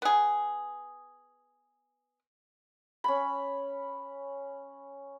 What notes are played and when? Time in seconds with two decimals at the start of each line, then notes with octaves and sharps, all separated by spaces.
0.02 B3 G#4
3.04 C#4 B5